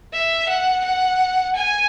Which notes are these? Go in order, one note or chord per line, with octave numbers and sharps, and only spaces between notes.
E5
F#5
F#5
G#5